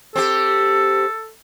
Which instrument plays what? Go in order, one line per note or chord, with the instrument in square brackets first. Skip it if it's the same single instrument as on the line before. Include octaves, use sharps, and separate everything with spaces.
[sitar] C4 G4 [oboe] A4